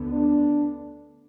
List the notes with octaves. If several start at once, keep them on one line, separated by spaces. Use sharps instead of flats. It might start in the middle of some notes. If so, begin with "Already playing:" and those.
Already playing: D2 D3 B3
D4